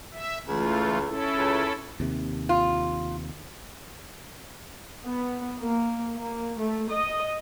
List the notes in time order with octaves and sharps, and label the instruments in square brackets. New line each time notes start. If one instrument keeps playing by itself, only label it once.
[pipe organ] E5
[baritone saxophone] C#2 [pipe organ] E3 A3 F4
[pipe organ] C#4 E4 A4
[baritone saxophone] C#2
[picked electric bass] D#2 C3
[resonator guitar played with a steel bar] F4
[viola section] B3
A#3
A#3
A3
D#5